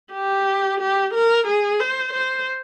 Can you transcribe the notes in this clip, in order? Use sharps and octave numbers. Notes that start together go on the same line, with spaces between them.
G4
G4
A#4
G#4
C5
C5